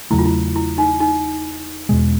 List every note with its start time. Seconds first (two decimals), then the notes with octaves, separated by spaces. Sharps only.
0.11 E2 C#3 F#3 A3 E4
0.19 F4
0.26 E4
0.56 E4
0.78 D#4
1.00 D#4
1.89 E2 B2 G#3